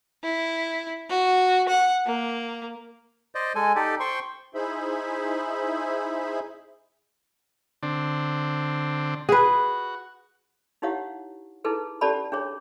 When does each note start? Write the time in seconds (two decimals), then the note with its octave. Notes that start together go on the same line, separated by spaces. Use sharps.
0.23 E4
1.10 F#4
1.69 F#5
2.06 A#3
3.35 C5 D5 D#5
3.55 G#3 A4 G#5
3.76 D#4 G4 A4 D5
4.00 C5 G5 C6 C#6
4.54 D#4 E4 G#4 C5 E5 B5
7.83 D3 C4 D4
9.29 F#4 G#4 B4
10.82 D#4 E4 G4 C#5 F5 F#5
11.64 D#4 E4 G#4 A4 B4
12.01 C#4 G4 A4 D5 A5 B5
12.32 D4 G#4 C#5